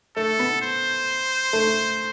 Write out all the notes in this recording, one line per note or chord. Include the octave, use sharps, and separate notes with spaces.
A3 A4
B3
C5
A3